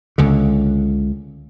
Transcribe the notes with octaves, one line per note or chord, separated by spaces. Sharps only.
C#2 D3